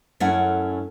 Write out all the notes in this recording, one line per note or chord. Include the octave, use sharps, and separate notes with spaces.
F#2 A3 C#4 E4 F#5